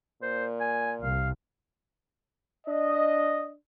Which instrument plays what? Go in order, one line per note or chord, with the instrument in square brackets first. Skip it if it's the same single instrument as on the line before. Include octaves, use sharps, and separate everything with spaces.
[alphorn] A#2 [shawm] C5
[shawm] G#5
[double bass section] C2 [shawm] F5
[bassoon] D4 [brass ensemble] D#5